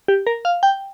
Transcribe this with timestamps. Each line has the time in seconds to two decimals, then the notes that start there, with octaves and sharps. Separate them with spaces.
0.08 G4
0.27 A#4
0.45 F5
0.63 G5